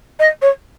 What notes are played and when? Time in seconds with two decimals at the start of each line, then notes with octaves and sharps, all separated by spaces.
0.19 D#5
0.42 C#5